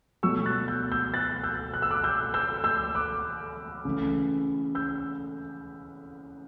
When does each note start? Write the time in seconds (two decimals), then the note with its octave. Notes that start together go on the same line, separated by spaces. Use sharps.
0.23 B2 F#3 A3 C#6 E6
0.46 F#6 A6
0.68 E6 G6
0.92 E6 G6
1.14 F#6 A6
1.43 E6 G6
1.74 F#6
1.82 E6
1.91 D6 F#6
2.04 E6 G6
2.34 E6 G6
2.64 E6 G6
2.95 D6 F#6
3.85 C#3 E3 A3
4.75 E6 G6